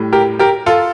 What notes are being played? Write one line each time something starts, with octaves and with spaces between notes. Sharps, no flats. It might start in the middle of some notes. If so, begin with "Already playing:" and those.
Already playing: A2 G3
G4 A#4
G4 A#4
F4 A4